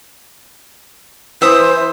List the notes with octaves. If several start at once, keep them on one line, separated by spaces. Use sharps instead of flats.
E3 C5 E5 D#6